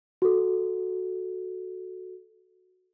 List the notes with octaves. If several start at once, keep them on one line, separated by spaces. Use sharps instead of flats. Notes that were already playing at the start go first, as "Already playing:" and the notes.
F#4 A4